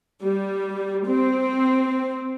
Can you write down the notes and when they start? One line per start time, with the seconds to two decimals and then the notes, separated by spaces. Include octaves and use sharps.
0.22 G3
1.07 C4